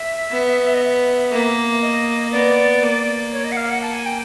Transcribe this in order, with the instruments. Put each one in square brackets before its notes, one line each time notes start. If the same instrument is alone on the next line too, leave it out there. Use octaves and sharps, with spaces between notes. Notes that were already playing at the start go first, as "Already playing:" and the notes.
Already playing: [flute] E5
[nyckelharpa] B3
[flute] D#5
E5
[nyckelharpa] A#3
[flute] D#5
[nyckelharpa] B3 [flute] D5
[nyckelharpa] A#3
[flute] C#5
D#5
F#5
F5
F#5
A5
G#5
G5